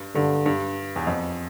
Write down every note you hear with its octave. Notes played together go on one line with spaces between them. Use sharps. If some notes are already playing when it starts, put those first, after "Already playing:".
Already playing: G2
G2 D3
G2
E2
F2